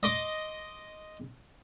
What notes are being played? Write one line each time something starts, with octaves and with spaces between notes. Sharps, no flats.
D#5 C6 D6